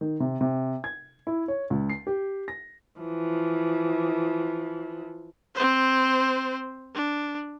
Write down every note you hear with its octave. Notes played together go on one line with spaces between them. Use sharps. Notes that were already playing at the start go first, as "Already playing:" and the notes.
D#3
C3
C3
G#6
E4
C#5
C#2
C7
G4
A#6
E3 F3
C4 C5
D4